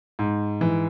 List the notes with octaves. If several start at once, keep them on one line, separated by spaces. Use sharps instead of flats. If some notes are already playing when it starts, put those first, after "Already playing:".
G#2
E3